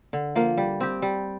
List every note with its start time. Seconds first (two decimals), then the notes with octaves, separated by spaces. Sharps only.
0.13 D3
0.35 F3 A#3
0.58 G3
0.80 C4 G4
1.02 G3